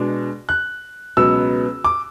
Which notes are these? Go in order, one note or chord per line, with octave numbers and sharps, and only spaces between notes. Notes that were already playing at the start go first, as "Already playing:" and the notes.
Already playing: B2 G#3 D4
F#6
C#2 B2 F#3 B3 E6
D6